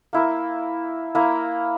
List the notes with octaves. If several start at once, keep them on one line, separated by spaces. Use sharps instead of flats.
A#3 E4 A#4
A#3 E4 A#4